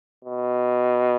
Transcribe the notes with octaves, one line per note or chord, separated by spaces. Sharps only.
B2